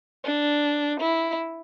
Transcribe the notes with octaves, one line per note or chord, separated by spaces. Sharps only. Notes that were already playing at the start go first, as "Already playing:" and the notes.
D4
E4